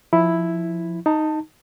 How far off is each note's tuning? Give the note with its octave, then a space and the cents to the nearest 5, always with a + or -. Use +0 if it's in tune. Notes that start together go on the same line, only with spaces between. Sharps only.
F3 +0 E4 +0
D#4 +0 A5 +20